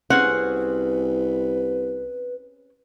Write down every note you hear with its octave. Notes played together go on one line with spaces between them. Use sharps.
C2 C4 C#4 G#4 B4 F#5